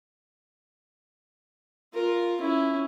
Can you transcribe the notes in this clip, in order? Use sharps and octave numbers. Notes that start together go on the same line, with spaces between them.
F4 A#4
C#4 E4